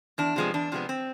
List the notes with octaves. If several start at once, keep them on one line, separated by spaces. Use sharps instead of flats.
E2 D4
C3 F3 G#3 B3
E2 D4
C3 F3 G#3 B3
C4